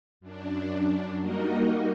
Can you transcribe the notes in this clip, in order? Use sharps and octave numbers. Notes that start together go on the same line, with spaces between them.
F#2 D4
G3 A#3 D#4 F#4 A#4 D#5